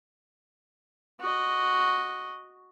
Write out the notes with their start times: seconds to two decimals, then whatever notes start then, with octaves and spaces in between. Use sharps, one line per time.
1.21 F#4 D#5